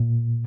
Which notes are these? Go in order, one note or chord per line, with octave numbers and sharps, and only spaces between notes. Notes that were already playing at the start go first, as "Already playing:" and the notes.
Already playing: A#2